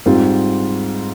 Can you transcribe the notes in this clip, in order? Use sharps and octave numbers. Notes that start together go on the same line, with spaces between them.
G#2 G3 C4 F4